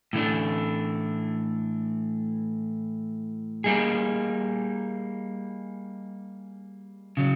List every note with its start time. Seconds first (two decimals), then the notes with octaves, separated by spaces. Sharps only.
0.13 A2 E3 A3 D4
3.64 G3 A#3 D#4 G#4
7.17 C#3 F#3